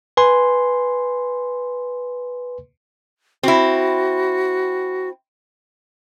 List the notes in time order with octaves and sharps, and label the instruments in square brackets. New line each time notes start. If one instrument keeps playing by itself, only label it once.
[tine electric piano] B4 G#5 C6
[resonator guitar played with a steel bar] C4 E4 [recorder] F#4